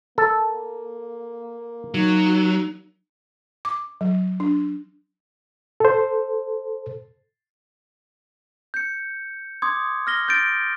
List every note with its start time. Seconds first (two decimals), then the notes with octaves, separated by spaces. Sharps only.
0.18 A#3 A4
1.94 F#3 D#4
3.65 D6
4.01 F#3
4.40 D4
5.80 A4 C5
8.74 G6 C#7
9.62 C6 D6 D#6 G#6
10.07 F6 A#6 G7
10.28 G6 A6 D7